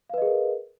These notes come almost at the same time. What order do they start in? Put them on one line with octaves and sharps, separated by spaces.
F5 B4 D#5 G#4 A#4